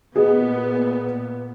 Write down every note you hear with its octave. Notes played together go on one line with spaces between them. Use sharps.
A#2 B3 G#4 D#5